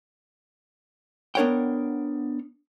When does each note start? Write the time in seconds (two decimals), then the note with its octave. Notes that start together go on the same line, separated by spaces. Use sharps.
1.35 B3 D4 A#4 C#5 F#5 G5